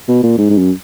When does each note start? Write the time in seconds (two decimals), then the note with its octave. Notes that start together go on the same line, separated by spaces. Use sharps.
0.08 B2
0.23 A#2
0.38 G#2
0.50 G#2
0.58 F#2